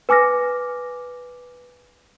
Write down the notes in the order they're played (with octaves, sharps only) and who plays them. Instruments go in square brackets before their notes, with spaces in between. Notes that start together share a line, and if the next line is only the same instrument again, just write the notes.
[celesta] B4 G#5 D6 F6 A#6